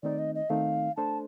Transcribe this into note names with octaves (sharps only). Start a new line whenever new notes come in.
D#3 A3 C4 D#4 D5
D#5
D#5
D#3 A3 C4 D#4 F5
A3 D4 A4 C5 A5